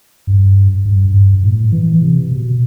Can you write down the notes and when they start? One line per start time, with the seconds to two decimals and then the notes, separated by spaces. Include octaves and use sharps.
0.27 G2
0.85 G2
1.14 G2
1.43 A2
1.72 E3
2.02 C3
2.31 B2